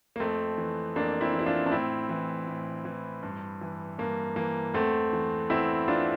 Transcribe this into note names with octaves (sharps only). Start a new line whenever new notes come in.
A#3
F2 A3 C4
E3
F2 A#3 D4
C4 E4
E3
E4
D4 F4
D4
A2 C4 E4
E3
A2
E3
G2
E3
G2 A#3
E3 A#3
E2 A3 C4
E3
E2 C4 E4
E3 D4 F4